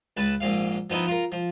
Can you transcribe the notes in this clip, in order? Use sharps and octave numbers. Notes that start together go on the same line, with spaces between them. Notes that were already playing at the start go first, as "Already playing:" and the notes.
C#2 B4 A5
A#1 G#2 F5
F3 B3 D#4 E4
F4 A#4
F3